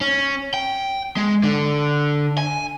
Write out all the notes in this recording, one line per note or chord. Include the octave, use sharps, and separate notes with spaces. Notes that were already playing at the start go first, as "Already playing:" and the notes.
C#4
G5
G#3
D3
G#5